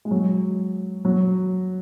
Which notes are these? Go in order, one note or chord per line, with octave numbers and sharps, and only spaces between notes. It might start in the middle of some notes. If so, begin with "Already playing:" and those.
G#3
F#3
F#3